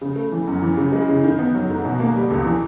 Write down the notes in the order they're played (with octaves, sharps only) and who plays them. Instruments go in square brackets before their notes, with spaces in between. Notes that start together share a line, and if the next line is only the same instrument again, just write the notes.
[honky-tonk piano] C#3
A3
E3
F#2
E3
C#3
G#3
C#3
D#3
B3
F#3
G#2
B2
A#3
G3
C#2
E3